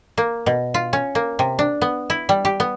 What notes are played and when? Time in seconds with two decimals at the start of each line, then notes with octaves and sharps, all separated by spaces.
0.18 A#3
0.46 B2
0.74 F4
0.93 C#4
1.15 A#3
1.39 C3
1.59 D4
1.82 B3
2.10 E4
2.29 G3
2.45 G4
2.60 B3